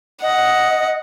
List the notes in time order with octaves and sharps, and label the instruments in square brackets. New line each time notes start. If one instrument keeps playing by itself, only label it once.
[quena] D#5 [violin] F#5